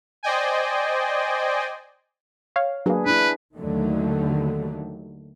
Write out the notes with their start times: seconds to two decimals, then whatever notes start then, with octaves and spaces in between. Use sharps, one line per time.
0.23 C5 D5 D#5 G5 G#5
2.56 C#5 F5
2.86 F#3 A#3 D4 G#4 B4
3.06 D4 E4 B4
3.58 D#2 D3 D#3 F#3 A3